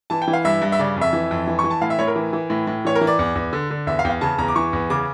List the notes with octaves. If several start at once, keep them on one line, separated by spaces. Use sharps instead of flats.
E3 A5
G5
E3
F5
G2 E5
G2
E5
C#3 D5
F2
E5
E3
F2
E3
C#6
E3
A5
A2 F5
E5
A2 C#5
A#4
E3
E3
A2
A2
E3 C#5
A#4
E3
D5
E2
E2
D3
D3
E2 E5
F5
E2 G5
F5
C#3 A5
E2 A#5
D6
E3 C#6
E2
C#3 D6